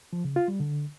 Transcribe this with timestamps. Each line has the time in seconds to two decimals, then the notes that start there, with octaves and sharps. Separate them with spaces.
0.13 F3
0.24 C#3
0.36 F4
0.48 G3
0.60 D3